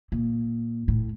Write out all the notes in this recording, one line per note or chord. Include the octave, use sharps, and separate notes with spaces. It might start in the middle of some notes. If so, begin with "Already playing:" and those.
A#2
A2